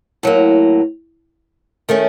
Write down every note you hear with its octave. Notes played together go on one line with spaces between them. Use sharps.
A2 F#3 A#3
D#3 A3 C#4